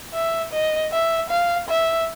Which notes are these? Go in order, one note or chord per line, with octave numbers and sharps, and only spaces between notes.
E5
D#5
E5
F5
E5